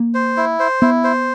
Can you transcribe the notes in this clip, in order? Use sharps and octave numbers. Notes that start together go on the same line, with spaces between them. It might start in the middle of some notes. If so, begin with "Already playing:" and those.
Already playing: A#3
C5
E4
C5
B3 E4
C5